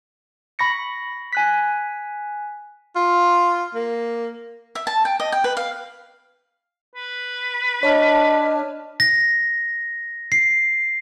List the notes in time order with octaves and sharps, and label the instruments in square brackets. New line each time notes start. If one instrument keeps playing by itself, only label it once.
[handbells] B5 C#6 A#6 C#7
G#5 F#6 B6
[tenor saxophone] F4
A#3
[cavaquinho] E5
A5
G5
D#5
G5
B4
F5
[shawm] B4
[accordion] D4 [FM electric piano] C#5 A5 F6 [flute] D#5
[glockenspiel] A#6
C7